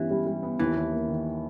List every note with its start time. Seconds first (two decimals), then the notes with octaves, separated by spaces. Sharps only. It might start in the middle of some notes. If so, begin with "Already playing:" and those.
Already playing: G2 E3 G3 B3 C#4
0.11 G3
0.27 G3
0.43 B3
0.59 D#2 E3
0.75 D#2
0.92 A#3
1.08 D#3